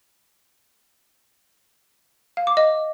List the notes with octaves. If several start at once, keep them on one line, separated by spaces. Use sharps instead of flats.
F5
D6
D#5